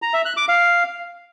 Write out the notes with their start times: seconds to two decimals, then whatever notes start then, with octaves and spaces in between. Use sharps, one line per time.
0.02 A#5
0.14 E5
0.25 F#6
0.37 D6
0.49 F5